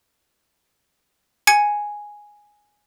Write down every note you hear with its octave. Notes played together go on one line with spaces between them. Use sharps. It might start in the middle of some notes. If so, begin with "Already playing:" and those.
G#5 G#6 C#7